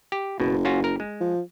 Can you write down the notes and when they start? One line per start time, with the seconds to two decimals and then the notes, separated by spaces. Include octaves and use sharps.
0.12 G4
0.40 F#1 B2
0.65 C#4 F4 F#4
0.84 A#4
1.00 G#3
1.21 F3